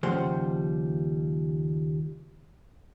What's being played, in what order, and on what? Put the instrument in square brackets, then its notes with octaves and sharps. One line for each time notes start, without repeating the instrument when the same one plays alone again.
[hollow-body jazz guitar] D#2 C#3 F3 G3 C5 F#5